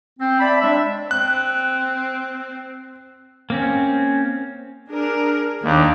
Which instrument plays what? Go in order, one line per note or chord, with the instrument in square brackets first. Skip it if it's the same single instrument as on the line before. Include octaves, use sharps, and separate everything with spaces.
[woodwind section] C4
D5 E5 A5 B5
G#3 D4 C#5 D5 E5
[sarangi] C4 [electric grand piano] F#6
[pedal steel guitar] A#3 C4 C#4
[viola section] D4 G#4 A#4
[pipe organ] D#2 [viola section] A#3 D4 D5